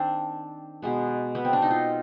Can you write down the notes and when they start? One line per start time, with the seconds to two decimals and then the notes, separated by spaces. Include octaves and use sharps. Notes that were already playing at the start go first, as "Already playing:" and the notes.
Already playing: D#3 C4 D4
0.82 B2 G#3 B3
1.35 B3
1.45 C4
1.53 D4
1.62 D#4
1.71 F4